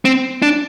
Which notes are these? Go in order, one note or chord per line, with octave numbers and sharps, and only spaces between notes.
C4
D4